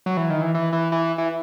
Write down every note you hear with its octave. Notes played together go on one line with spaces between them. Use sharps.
F#3
E3
D#3
E3
E3
E3
E3
E3